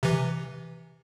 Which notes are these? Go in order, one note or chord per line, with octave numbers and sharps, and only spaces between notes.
C3 E3